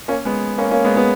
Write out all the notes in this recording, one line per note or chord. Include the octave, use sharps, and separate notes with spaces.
A#3 C#4
G#3 B3
A#3 C#4
A#3 C#4
G#3 B3
G#3 B3